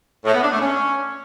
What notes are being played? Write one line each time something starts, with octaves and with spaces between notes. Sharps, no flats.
A2
B3
D4
A3
C#4